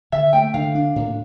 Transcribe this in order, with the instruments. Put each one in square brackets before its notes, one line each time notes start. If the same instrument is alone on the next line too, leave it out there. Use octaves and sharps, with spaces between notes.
[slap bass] D3 [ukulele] E5
[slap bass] A3 [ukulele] G5
[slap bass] D3 [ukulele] F5
[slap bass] D4
A2